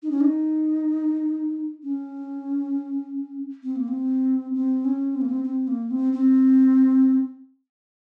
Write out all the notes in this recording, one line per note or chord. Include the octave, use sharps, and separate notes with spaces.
D#4
C#4
D#4
C#4
C4
A#3
C4
C4
C#4
C4
A#3
C4
C4
A#3
C4
C4